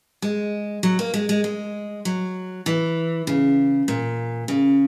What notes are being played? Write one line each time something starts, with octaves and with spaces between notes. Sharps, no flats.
G#3
F#3
A#3
G#3
G#3
G#3
F#3
E3
C#3
A#2
C#3